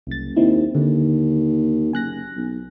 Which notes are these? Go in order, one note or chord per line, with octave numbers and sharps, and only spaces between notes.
F#1 C2 A6
D#2 C4 D#4 E4
D#2 D3
F#1 G#5 F#6 A#6
B1